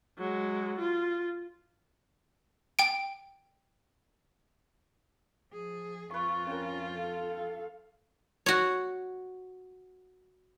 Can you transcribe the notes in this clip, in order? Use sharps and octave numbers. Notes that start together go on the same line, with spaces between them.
F#3 G#3
F4
G5 D7
F3 G#4
F2 F4 B4 C#6
C#4 A#4 C5 G5
A4 F5
F#4 C#5